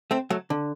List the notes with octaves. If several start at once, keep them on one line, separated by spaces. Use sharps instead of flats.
A3 C4
F#3 A3
D3